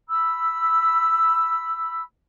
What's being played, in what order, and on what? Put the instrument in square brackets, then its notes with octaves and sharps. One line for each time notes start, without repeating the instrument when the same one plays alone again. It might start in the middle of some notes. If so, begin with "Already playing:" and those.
[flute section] B5 E6